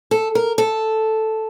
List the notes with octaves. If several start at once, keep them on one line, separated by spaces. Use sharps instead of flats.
A4
A#4
A4